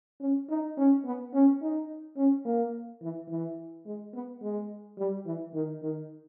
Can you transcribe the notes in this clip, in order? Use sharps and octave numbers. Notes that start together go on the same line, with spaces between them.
C#4
D#4
C#4
B3
C#4
D#4
C#4
A#3
E3
E3
G#3
B3
G#3
G3
E3
D#3
D#3